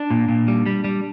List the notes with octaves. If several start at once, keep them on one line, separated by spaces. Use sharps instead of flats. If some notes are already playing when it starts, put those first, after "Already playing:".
Already playing: D4
A#2
A#2
G3
G3
G3